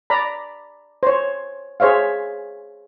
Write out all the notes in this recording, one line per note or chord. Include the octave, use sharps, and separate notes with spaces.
D5 A#5 B5
C5 C#5
G#4 C5 C#5 E5 F5